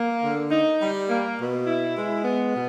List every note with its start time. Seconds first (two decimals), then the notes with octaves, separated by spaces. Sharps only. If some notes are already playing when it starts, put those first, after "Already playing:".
Already playing: A#3
0.22 D3
0.51 D#4
0.80 G3
1.09 A#3
1.38 B2
1.67 E4
1.95 G#3
2.24 B3
2.53 B2